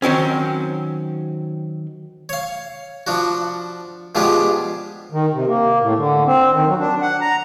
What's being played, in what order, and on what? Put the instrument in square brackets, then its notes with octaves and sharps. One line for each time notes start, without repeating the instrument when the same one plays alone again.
[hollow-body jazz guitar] D#3 F#3 C4 C#4
[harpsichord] C#5 F5
F3 D4 F#4
B2 F3 G#3 D4 F4 G4
[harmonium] D#3
C3
A#3
A2
D3
C4
D#3
F#3
D4
F#5
A#5